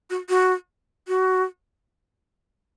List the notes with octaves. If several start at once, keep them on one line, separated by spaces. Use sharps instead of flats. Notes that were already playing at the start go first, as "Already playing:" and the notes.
F#4
F#4
F#4